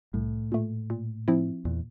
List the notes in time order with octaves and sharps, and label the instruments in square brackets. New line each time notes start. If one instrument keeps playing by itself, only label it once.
[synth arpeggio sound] C2 [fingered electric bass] A2
[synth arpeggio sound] A#2 A3
A#2
F3 C4 E4
[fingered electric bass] E2 [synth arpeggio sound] A#2